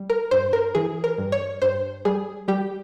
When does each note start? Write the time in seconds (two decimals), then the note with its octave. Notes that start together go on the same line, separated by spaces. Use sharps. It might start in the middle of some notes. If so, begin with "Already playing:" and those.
Already playing: G3
0.10 A#4
0.31 G2 C5
0.53 A#4
0.75 E3 G#4
1.04 A#4
1.18 G2
1.32 C#5
1.62 G2 C5
2.05 G3 G#4
2.48 G3 G4